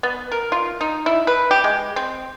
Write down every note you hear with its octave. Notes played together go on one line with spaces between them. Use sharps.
B3
A#4
F4
D#4
E4
B4
G4
G#3
C4